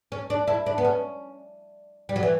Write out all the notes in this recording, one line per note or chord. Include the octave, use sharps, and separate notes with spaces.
C#4
D4
E4
D4
B3
C#4
G3
F#3
E3